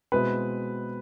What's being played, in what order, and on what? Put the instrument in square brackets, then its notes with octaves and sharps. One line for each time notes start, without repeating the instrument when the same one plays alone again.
[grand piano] B2 G#3 C4 E4 [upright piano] B4